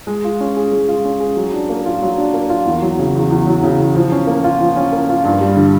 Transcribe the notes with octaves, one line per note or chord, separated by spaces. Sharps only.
G#3
F4
C#4
G#4
G#3
F4
C#4
G#4
F#3
D4
A#3
F4
F#3
D4
A#3
F4
E2
F#3
C#3
E2
E2
F#3
C#3
E2
F3
C#4
A#3
F4
F3
C#4
A#3
F4
G2
G3
D3